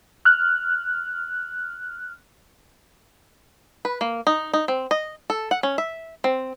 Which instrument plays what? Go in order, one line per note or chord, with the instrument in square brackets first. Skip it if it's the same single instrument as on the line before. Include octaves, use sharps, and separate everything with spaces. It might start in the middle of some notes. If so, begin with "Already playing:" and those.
[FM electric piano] F6 F#6
[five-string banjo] B4
A#3
D#4
D#4
C4
D#5
A4
F#5
C#4
E5
C4